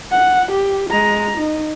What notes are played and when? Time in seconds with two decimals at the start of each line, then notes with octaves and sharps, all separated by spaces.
0.12 F#5
0.51 G4
0.90 G#3 A#5
1.38 D#4